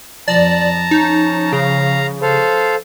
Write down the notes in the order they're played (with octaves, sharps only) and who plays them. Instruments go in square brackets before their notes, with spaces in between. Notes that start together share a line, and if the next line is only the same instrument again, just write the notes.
[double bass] F2 F3 [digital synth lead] D5 [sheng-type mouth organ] A5 A#5
[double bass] F3 C#4 [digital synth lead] D#4
[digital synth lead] C#3 [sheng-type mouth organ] F5 A#5
[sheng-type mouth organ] A4 C5 F5